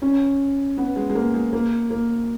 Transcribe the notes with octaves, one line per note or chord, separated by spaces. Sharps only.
C#4
B3
G#3
G#3
A#3
G#3
A#3
A#3